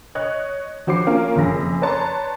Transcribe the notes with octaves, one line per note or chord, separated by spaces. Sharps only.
C#5 D#5 F#6
F3 F#4 C5 D6 C7
A#3 C#4 F4 A#4
F#1 F2 C#4 G#4 A#6
B4 C#5 D5 A5 A#5 C6